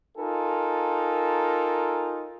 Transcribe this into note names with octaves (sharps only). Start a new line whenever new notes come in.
D#4 F4 A4 A#4 G#5